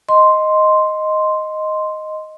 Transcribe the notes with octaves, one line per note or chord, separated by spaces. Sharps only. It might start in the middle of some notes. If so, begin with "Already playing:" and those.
D#5 C6